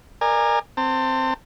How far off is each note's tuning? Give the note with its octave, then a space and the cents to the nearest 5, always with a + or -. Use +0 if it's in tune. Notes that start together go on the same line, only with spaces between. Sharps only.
A#4 +0 D5 +35 G#5 -15
C4 +0 A5 +40